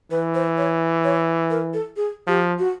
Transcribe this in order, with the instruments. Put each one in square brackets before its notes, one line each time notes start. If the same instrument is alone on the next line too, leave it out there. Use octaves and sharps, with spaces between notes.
[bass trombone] E3 [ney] B4
[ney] C5
C#5
C#5
A#4
A4
G#4
[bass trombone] F3 [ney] G4
[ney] F#4